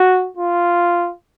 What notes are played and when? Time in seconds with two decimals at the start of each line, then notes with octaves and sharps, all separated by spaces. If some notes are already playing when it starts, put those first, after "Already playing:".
Already playing: F#4
0.37 F4